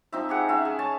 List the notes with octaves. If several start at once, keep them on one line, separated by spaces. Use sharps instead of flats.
F3 C4 D#4 E5
G4 G#4 F#5
C#4 E5 F5
G#4
C#5 G#5 A5 C#6